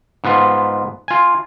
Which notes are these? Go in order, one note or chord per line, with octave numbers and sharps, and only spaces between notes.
G#2 B3 F4
F4 G#5